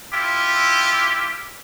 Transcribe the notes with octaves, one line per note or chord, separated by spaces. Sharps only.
E4 F4 G4